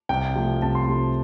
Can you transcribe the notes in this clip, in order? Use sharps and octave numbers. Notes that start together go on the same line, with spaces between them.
C2 G5
C3 F3 A3
C2 A5
C6
C3 F3 A3